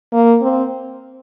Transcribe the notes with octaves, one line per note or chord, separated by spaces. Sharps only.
A#3
C4